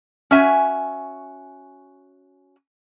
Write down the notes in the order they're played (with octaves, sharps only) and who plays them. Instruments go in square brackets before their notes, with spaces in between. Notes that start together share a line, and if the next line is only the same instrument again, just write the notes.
[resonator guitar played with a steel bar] C#4 F#4 E5 G#5